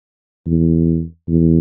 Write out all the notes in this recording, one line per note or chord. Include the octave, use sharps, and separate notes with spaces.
E2
E2